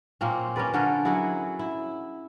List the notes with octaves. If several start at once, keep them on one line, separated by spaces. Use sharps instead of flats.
A#2 A#3 C4 C#4
C#4 A#4 B4 D5
D3 C#4 A4 A#4
F#3 E4 G#4 F#5
E4